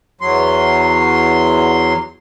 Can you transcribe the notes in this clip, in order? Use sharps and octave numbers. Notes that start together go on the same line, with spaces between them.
E2 F#3 C6